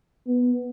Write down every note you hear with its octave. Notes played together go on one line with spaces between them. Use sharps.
B3